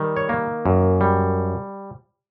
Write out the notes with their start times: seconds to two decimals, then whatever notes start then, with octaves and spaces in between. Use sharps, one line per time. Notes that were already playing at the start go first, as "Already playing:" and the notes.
Already playing: D#3 G3
0.17 C#5
0.29 A#3
0.66 F#2
1.01 G3